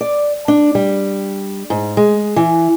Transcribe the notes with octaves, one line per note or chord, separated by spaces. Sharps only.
D5
D4
G3
G#2
G#3
E3